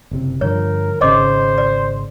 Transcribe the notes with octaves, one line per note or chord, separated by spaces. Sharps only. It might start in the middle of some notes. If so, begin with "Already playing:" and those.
F#1 C3
G2 D3 F3 A#4 C#5
G#1 C#3 C5 C#5 D#5 D6
D5